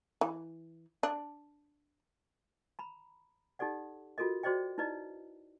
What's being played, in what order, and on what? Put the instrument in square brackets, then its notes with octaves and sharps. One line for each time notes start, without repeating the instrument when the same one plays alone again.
[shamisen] E3
D4
[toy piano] A#5 B5
D#4 G4 A4 D5 F#5
F4 F#4 A4 A#4 D#5
F#4 G#4 C5 D5 D#5 G5
D#4 E4 B4 D5 D#5